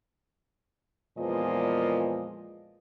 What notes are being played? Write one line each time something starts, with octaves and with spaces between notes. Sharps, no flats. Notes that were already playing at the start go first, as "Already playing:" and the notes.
E2 A#2 F3 G#3 B4 D#5